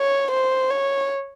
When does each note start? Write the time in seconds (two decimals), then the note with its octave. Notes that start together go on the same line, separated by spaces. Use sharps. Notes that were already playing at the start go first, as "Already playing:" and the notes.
Already playing: C#5
0.31 C5
0.70 C#5